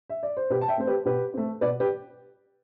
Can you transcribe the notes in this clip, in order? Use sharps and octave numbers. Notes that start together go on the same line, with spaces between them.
E5
D5
C5
B2 G4 B4
A5
E5 G5
A3 C4 C5
G4 B4
B2 G4 B4
A3 C4
B2 B4 D5
G4 B4